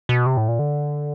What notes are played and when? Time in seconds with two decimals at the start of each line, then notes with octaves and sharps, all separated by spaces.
0.09 B2
0.26 C3
0.37 A2
0.48 A#2
0.59 D3